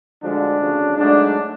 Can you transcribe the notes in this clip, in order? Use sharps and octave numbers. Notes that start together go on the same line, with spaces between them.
D2 D3 F3 G#3 D4
D2 C#3 F3
G#2 F#3 A3 D4